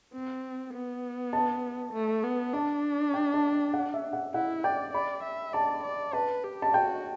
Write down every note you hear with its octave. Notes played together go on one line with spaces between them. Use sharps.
C4
B3
A5
A3
B3
D4 A5
G5
A5
F#5
E5
F#5
E4 F#5
D5 G5
D5 B5
E5
D5 A5
D5
B4 A5
G4
A5
F#4 G5